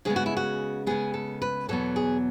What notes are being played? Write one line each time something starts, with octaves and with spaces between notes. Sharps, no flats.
C#3 G#3 B3 G#4
F#4
E4
F#4
C#3 G#3 B3 G#4
A4
B4
E2 B2 F#3 B3 A4
G#4